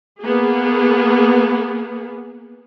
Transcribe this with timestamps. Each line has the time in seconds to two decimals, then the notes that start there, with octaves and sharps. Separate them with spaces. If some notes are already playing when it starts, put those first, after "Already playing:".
0.21 A#3 B3 G#4